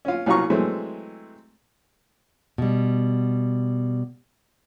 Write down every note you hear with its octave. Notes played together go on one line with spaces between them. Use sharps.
C#4 F4
C2 F#3 C#4 F4 A#5 C#6
E3 F#3 G#3 A3 C4
B2 G3